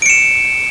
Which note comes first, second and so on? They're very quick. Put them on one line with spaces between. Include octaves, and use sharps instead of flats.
D7 C#7 E7